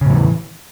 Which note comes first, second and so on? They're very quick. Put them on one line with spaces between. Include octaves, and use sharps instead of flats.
C#3 A2 F3 E3